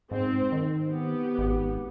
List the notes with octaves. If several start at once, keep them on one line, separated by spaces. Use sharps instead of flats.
G#2 C4
D#3
B3 G4
G#1